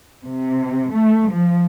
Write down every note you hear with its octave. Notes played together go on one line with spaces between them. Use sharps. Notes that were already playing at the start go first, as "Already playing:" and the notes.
C3
A3
F3